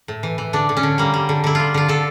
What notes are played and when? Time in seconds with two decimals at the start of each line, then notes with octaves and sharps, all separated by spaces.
0.08 A2
0.23 E3
0.38 E3
0.53 D3 D4
0.69 D3
0.77 C#4
0.83 D3
0.98 G3 A#3
1.14 G3
1.29 D3
1.44 D3 E4
1.55 G3 F4
1.74 D3 F4
1.89 D3 A4